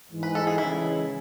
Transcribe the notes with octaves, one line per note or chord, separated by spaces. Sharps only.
G#2 E3 G#3
B4
A4
G#4
C#3 E3 G#3 E4